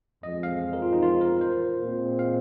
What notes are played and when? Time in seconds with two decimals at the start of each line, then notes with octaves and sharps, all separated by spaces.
0.23 F2 F3 G#3 C4 D#5
0.43 F5
0.73 A#4
0.82 F4
0.92 D#4
1.02 F4
1.21 A#4
1.41 C5
1.80 A#2 G#3 C4
2.19 F5